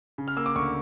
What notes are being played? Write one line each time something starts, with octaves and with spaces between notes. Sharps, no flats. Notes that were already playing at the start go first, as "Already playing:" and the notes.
C#3
F6
A#3 E6
D6
D2 C#6